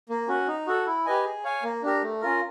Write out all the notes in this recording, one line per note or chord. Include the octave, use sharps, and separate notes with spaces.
A#3
C#4 F#4
D#4
F#4 A4
E4
G4 B4 D#5 G#5
G#4
C#5 F5 G#5
A#3
D4 G4 A#4
A3
C#4 F4 A#4